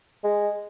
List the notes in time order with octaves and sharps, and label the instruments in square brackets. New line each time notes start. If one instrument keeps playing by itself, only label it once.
[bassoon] G#3